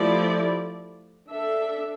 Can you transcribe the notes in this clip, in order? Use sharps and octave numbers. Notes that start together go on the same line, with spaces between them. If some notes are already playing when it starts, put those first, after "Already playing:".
Already playing: F3 A3 E4 G4 D5
D4 A4 E5